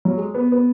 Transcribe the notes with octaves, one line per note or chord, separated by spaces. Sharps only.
F#3
G#3
B3
B3